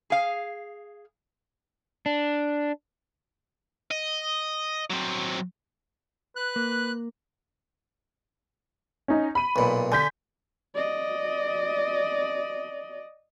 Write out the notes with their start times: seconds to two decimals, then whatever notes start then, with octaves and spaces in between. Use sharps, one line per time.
0.10 G#4 F5
2.06 D4
3.91 D#5
4.91 F#3 C4
6.36 B4 F#6
6.56 A#3
9.08 C#4 D#4
9.35 B5 D#7
9.56 B1 A#2
9.92 D3 G#5 G6 B6
10.74 D5 D#5